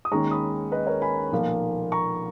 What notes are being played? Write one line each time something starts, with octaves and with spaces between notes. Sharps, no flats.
D#6
D#2 D#3 G#3 C#4 A#5 C#6
B5 D#6
B4 D#5
A#4 C#5
G#5 B5
B1 A#2 F3 A#3
A#5 C#6